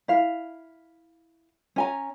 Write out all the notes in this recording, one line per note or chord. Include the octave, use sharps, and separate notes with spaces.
E4 F5
C#4 G#5 A#5